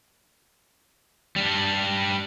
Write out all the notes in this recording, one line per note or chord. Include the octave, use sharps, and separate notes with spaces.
G3 D4